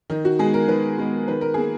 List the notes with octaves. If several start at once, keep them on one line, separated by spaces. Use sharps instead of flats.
D#3 D#4
F#4
G#3 B3 G#4
A#4
D#3 B4
G#3 B3
D#3 B4
A#4
A#3 G#4